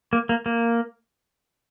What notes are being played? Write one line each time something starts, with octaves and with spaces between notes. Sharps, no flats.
A#3
A#3
A#3